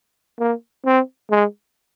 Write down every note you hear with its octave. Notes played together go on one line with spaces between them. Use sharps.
A#3
C4
G#3